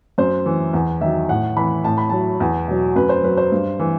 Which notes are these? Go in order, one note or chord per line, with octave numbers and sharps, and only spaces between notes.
F#2 C5
E3
E2
D#3 F#3 E5
A2 F#5
E3 B5
A2 A5
B5
F#3 A5
E2
B2 F#3
F#2 B4
C5
F#3 B4
C5
G2
E3